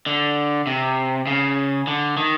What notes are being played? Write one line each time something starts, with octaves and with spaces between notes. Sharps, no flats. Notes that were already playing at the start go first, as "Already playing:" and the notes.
D3
C3
C#3
D3
D#3